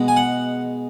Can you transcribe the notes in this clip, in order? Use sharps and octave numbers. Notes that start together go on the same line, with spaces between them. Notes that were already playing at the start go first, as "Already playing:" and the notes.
Already playing: B2 G#3 B3
G#5
F#5